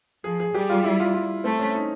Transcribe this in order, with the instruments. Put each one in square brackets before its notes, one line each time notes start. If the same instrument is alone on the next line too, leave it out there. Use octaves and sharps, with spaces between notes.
[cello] F3 [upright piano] G#4
[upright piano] G#4
[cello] G3 [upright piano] G4
[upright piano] F4
E4
F4
F4
[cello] A3 [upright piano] C4
[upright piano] C#4
D#4